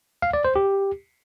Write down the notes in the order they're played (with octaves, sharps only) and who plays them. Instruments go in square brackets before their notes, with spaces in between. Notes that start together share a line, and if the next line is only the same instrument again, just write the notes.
[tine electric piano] F5
D5
C5
G4